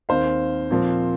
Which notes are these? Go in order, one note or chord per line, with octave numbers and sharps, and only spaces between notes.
D#2 D#3 C4 C5 F5
A#2 F3 C4